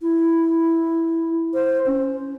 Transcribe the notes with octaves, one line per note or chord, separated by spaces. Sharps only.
E4
C5
C#4